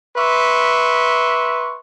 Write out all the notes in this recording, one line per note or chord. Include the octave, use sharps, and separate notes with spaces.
B4 E5 C6 C#6